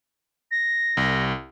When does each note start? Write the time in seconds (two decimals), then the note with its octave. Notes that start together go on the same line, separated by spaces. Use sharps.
0.51 A#6
0.97 C2